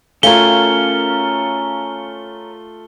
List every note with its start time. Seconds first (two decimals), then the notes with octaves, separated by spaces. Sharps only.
0.23 A3 C#4 F4 A#4 F5 G#6 G7